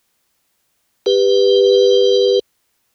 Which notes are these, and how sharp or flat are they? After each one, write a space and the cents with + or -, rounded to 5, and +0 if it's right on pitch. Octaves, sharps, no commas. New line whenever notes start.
G4 +15 B4 +0